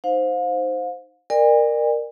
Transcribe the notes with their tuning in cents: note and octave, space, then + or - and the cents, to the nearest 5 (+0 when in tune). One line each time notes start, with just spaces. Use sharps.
D#4 +0 C5 +0 F5 +35
A#4 +0 D5 +35 G#5 -45